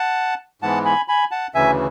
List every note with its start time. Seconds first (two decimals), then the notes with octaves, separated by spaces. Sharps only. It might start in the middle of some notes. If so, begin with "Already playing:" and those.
Already playing: F#5 A5
0.62 G#2 E3 G#3 B3 F#5 A5
0.85 G#5 B5
1.08 G#5 B5
1.31 F#5 A5
1.54 D2 C#3 E3 E5 G#5